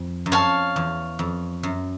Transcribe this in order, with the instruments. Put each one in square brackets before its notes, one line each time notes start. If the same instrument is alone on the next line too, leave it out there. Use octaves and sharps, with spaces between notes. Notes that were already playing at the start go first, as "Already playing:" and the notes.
Already playing: [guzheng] F2
F#2
[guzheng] F2 [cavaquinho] C#5 F5 A5
[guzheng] E2
F2
F#2